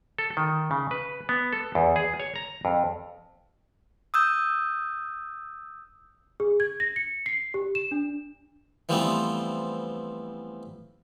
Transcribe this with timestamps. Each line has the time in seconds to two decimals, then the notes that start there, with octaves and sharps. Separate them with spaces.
0.18 A4
0.37 D#3
0.71 C#3
0.91 B4
1.29 B3
1.53 A4
1.75 E2
1.96 G#4
2.20 C#5
2.36 A#5
2.65 F2
4.14 D#6 E6 G6
6.40 G#4
6.60 G#6
6.80 A#6
6.96 C#7
7.26 C7
7.54 G4
7.75 E7
7.91 D4
8.89 E3 F3 G3 A3 B3 C4